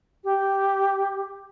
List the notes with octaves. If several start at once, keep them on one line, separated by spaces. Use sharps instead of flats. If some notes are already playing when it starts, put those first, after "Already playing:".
G4